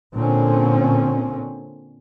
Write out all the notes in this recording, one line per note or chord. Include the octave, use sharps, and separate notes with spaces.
A#2 D3 C4 C#4